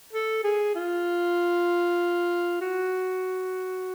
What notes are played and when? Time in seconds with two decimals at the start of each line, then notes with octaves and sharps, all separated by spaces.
0.13 A4
0.44 G#4
0.75 F4
2.61 F#4